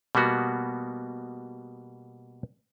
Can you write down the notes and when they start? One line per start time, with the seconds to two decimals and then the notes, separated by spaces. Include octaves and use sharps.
0.15 B2 G3 A#3 B3 F#4